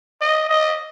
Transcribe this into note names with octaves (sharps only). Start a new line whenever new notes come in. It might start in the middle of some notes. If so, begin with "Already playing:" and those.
D#5
D#5